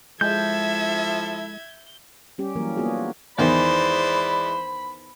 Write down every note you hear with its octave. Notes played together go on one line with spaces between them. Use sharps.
F3 G#3 E4 A4 E5 G6 G#6
G3 C#4 G4
E3 F#3 G3 A#3 A#4
A#3 B3 D4 F4 F#4 G#4
E2 D#3 E3 G#3 C5 D5 B5